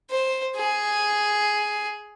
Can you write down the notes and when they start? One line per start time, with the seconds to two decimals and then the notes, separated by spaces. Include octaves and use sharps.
0.10 C5
0.56 G#4